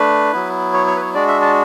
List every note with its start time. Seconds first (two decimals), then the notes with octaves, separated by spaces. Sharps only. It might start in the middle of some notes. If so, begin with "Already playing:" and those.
Already playing: A3 D4 B4
0.33 F#3 B3 E4
0.74 C#5
0.87 C#5
0.96 B4
1.01 C#5
1.14 G#3 D4 F#4 D5
1.28 E5
1.42 A5